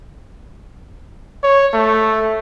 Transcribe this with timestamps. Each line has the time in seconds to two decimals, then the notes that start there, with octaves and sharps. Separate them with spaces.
1.43 C#5
1.73 A3